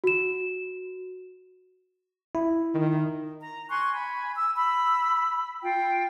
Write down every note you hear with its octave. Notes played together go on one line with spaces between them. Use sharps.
F#4 E7
E4
D#3
A#5
G#5 C6 C#6 F#6
G#5 B5
E6
B5 E6
F4 G5